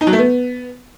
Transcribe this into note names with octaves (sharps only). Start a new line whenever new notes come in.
D#4
F#3
A3
B3